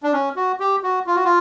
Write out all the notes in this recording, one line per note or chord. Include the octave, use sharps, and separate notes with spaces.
D4
C#4
F#4
G4
F#4
F4
F#4
F4